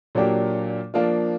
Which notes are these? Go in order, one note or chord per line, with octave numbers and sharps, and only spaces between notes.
A#2 F#3 A#3 D4 G4
F3 A#3 D4 F4